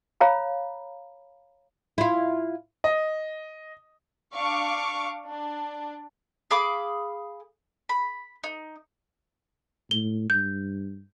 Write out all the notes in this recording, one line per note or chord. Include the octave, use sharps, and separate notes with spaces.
C#5 F5 A#5 B5
E4 F4
D#5
D4 F5 C#6 D6
D4
G#4 F5 B5 D6
B5
D#4
A2 G7
G2 G6